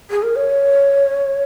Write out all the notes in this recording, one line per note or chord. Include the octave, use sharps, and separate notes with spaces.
G#4
A#4
C#5